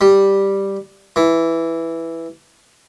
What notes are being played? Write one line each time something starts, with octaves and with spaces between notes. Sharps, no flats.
G3
E3